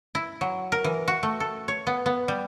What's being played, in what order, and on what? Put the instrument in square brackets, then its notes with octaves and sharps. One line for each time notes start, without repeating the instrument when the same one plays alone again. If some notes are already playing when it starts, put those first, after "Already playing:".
[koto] E4
F#3
A#4
E3
F#4
A3
A4
C#5
B3
B3
G3